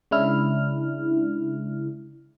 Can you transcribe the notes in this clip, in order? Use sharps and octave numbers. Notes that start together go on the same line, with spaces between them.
C#3 G#3 D4 E4 F6